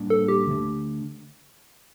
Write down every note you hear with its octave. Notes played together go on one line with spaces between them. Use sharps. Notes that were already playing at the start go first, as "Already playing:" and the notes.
Already playing: A2 G3 A#3 D4
A4
G4
D3 A3 D4